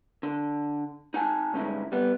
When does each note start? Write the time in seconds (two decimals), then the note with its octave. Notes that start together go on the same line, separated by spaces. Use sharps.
0.23 D3
1.14 D#4 F#5 G#5 A5
1.53 D2 G2 G#3 C#4 D#4 E4
1.92 G3 B3